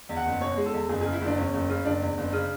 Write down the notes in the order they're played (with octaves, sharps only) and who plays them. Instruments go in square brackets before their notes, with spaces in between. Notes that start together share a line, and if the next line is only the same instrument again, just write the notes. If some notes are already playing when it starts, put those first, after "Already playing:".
[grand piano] E2
F#5
F#1
B2 C#5
G#3
A4
E2
F#1 G#4
C#3 G#4
E4
F#1 D4
E2 C#4
F#1
C#3
F#1 D4
E2
F#1
C#3